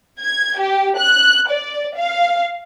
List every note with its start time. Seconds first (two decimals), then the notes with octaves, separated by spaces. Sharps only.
0.20 G#6
0.58 G4
0.97 F#6
1.50 D5
1.96 F5